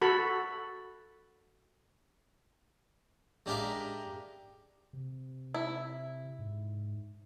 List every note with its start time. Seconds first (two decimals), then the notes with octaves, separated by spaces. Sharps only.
0.01 F#4 A4 B5
3.46 G#3 D4 G4 A#4 E5 F5
4.93 C3
5.54 E4
6.39 G#2